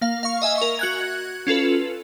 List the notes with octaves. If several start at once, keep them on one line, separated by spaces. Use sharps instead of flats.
A#3 F5
F5 C#6
D#5 E5 G#5
A#4 C#6
F#4 F#6 G#6
C#4 F4 A4 B4